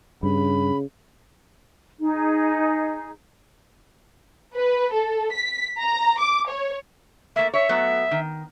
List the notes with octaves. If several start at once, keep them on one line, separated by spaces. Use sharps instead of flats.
G2 C#3 B5
D#4 G#4
B4
A4
B6
A#5
D6
C#5
A3 A#3 E5
C#5 E5
F#3 A3 B3
D#3